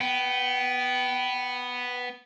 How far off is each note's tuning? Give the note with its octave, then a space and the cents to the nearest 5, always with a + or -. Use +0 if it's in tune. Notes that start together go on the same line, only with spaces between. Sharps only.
B3 +0 G5 -30